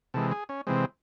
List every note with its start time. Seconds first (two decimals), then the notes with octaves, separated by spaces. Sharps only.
0.14 C3 E3 G#3 A4
0.32 G#4
0.49 C#4
0.67 C3 E3 G#3 C4